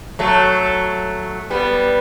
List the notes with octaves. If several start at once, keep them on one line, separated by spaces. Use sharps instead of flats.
F#3 A3
G3 B3